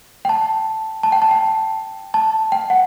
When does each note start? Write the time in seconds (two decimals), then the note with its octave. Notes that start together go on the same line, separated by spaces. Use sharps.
0.25 G5
0.29 A5
1.03 A5
1.12 G5
1.22 A5
1.31 G5
2.14 A5
2.52 G5
2.70 F#5